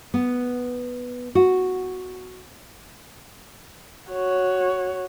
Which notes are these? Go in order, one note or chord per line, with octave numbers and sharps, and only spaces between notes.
B3
F#4
F#4 C#5